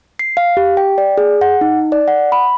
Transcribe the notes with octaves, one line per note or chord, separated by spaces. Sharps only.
C7
F5
G4
G5
D5
G#4
F#5
D#4
D5
F#5
B5